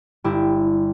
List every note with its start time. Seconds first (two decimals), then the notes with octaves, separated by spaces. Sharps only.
0.24 G1 E4 G4